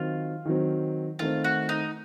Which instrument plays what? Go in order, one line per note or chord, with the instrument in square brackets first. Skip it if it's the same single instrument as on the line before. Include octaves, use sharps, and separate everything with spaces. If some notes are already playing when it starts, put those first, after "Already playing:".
Already playing: [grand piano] D#3 F#3 C4 [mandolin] F4
[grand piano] D#3 F#3 C4
[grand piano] D#3 A3 C4 [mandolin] F4
[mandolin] F#4
D#4